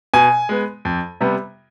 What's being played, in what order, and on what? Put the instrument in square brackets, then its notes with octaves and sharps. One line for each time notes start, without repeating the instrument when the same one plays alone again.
[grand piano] B2 G#5
G#3 B3
F2
C3 G3 B3